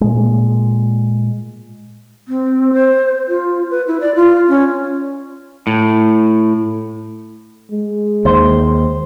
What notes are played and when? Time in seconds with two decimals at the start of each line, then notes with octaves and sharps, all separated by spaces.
0.01 A#2 G#3
2.28 C4
2.73 C5
3.28 F4
3.70 B4
3.87 E4
4.01 D5
4.15 F4
4.48 C#4
5.67 A2
7.71 G#3
8.25 D#2 C5